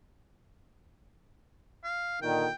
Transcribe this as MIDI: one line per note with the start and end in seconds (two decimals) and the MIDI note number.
1.84 2.17 77
2.22 2.46 46
2.22 2.46 50
2.22 2.46 51
2.22 2.55 79